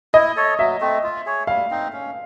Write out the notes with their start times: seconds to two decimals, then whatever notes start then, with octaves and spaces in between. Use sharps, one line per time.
0.14 E4 D#5
0.36 A4 C#5
0.59 F#3 E5
0.81 A3 C4
1.04 F4
1.26 G#4 C#5
1.47 G3 F5
1.71 C4 D#4
1.93 C#4